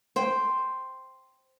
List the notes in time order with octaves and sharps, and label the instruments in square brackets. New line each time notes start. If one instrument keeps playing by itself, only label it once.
[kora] C5 G5